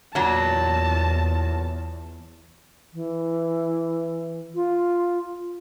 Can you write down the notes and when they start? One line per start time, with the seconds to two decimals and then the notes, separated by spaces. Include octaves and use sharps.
0.15 E2 A#2 F#3 A5
2.94 E3
4.55 F4